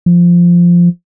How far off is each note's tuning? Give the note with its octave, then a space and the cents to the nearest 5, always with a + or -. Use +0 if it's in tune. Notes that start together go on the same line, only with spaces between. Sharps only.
F3 -5